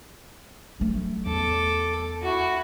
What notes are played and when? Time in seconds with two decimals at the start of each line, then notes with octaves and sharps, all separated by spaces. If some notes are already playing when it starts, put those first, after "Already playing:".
0.80 F#3 A3
1.26 E2 A4 D6
2.23 E4 F#4